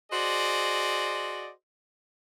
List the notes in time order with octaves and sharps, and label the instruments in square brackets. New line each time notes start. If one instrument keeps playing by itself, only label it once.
[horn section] F#4 G#4 C5 D5 D#5